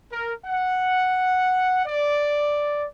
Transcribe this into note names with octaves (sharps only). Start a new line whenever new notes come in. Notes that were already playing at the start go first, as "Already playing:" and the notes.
A#4
F#5
D5